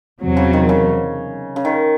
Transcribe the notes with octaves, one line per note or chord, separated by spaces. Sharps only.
E2 C3 F#3
C#3
D#3
C#3
C#3
D#3